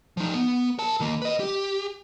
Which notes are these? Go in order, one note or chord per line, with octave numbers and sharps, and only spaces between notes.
F3 D#4
B3
A#4 A5
D#3 A#3
B4 D#5
G4